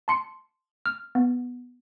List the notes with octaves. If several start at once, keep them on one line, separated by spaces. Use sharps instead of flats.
A5 C6 C#7
F6
B3